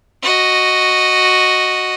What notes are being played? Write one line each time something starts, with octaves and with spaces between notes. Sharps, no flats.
F#4 D#5